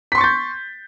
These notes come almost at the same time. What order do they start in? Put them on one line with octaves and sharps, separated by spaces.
B6 C6 C#6 A6 G6